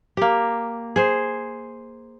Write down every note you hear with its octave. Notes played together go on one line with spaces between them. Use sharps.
A#3 G4
G#4 C5